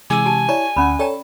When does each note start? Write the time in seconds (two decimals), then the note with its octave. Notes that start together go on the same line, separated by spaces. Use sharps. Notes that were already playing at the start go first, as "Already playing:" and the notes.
0.10 C3 E3 G#3 G#5 D6 E6
0.25 G4 A5
0.49 E4 C#5 D5 A#5
0.76 D2 C#4 F#5 B5
0.99 A4 C#5 D5 G5 A#5